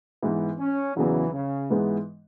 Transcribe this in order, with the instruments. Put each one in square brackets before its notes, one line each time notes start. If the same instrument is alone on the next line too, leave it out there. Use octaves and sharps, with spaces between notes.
[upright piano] G#2 E3 B3
[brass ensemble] C#4
[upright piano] E2 C#3 F#3 [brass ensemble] E3
[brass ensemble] C#3
[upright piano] G#2 E3 G#3 B3